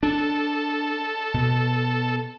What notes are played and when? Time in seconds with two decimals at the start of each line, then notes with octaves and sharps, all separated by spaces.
0.03 D4 A4
1.34 B2